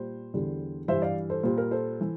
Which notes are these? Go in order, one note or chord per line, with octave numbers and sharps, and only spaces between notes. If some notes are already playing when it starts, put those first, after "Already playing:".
Already playing: A#2 G3 C5
E2 D3 G3
G2 E3 G3 C5 E5
D5 F5
A4 C5
A#2 G3 C5
A#4
A4 C5
E3